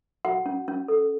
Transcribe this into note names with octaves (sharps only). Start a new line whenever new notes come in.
F#4 F#5
C#4
C#4
A4